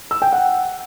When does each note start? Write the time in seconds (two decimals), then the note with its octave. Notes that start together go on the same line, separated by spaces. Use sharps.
0.11 E6
0.22 G5
0.33 F#5